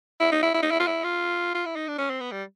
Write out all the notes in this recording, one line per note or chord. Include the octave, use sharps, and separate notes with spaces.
E4
D#4
E4
E4
D#4
E4
F4
E4
F4
F4
E4
D#4
D4
C#4
C4
B3
G3